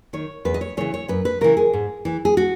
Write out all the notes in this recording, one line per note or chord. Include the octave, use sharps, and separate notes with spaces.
D#3 C#5
E2 B4
D#5
C#5
C#3 E3 C#5
C#5
F#2 B4
B4
C#3 E3 A#4
G#4
G#2
E3
G#4
F#4